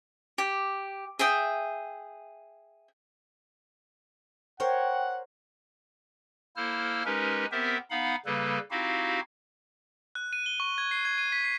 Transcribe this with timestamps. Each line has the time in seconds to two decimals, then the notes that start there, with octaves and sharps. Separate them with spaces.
0.38 G4
1.19 G#4 E5 G5 D#6
4.60 A#4 C5 C#5 F#5 G5
6.56 A#3 E4 A4 C5 F6
7.05 G#3 C#4 D#4 G4 A#4 B4
7.52 B3 C4 G4 A#4 C5 E5
7.90 B3 D#4 F5 F#5 B5
8.26 C#3 G3 A#3 A4 B4
8.71 C4 D#4 E4 F#4 G4 F5
10.15 F#6
10.33 D#7
10.46 G7
10.60 C#6
10.78 G#6
10.91 C7
11.05 G#6
11.18 D#7
11.32 B6
11.45 C7